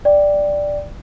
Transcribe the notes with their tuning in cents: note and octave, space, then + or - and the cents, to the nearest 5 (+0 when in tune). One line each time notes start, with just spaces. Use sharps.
D5 +0 G5 +0